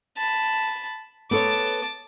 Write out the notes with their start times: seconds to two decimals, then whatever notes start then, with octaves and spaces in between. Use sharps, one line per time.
0.18 A5 B5
1.31 B3 A4 C#5 A5 D6